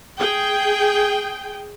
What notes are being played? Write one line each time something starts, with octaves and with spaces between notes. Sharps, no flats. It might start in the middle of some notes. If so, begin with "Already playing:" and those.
G#4 G5